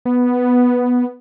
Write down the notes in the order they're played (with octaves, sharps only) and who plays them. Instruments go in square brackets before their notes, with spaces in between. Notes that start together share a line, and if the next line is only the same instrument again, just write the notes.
[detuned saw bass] B3